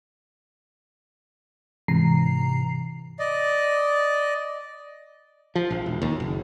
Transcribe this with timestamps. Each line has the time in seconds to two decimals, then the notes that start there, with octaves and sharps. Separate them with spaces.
1.88 G#2 C3 E3 A#5 C7
3.19 D5 D#5
5.55 F3
5.70 A#1
5.86 E1
6.02 D#2
6.20 F#1